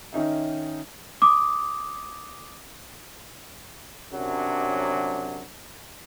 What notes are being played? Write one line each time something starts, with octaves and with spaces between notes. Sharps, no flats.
D#3 C#4 D#4 E5
D6 D#6
F#2 C3 F#3 D4